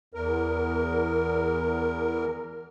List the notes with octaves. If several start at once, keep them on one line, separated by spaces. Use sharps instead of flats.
E2 A#4